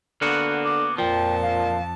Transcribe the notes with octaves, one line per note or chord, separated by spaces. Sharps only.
D3 A#3 B3 F#4
D6
F2 A#2 F3 G5 A5
F5